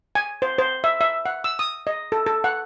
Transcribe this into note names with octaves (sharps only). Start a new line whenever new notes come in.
G#5
C5
C5
E5
E5
F#5
E6
D#6
D#5
A4
A4
F#5